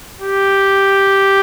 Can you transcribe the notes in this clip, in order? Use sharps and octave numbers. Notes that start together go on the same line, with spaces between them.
G4